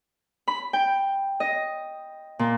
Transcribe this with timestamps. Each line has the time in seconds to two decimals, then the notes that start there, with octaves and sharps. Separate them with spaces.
0.48 B5
0.73 G5
1.40 D#5
2.39 A#2